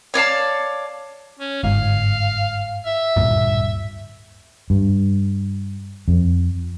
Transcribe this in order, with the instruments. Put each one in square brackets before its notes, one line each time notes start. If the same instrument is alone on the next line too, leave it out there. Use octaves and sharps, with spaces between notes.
[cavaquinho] C#5 D5 F5 A5
[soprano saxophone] C#4
[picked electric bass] G1 G#2 [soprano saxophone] F5
[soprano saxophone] E5
[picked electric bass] D1 G2 A#2
[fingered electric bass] G2
F2